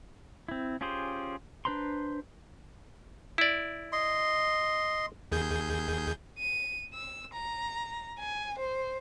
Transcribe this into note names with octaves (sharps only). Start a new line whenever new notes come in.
C4 E4
C#4 F4 G4 G#4 C5
D4 B4 C5 A#5 C6
E4 D5
D#5 C6
D#2 G#4 G6
D#7
E6
A#5
G#5
C5